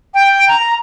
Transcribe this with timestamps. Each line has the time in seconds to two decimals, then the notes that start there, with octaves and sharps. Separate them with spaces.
0.14 G5
0.48 A#5